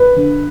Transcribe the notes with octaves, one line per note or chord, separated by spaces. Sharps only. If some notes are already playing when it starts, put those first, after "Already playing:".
Already playing: B4
D3